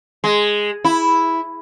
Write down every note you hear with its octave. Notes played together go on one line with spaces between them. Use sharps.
G#3
E4